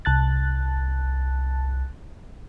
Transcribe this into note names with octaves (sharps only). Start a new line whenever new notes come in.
C2 A5 F#6 A6